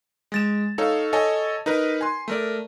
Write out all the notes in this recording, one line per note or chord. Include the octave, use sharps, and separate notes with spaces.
G#3 A6 E7
D#4 A4 C#5 F5
A4 C#5 D#5 G#5 A5
D#4 A#4 B4
G#5 C6
A3 A#4 D5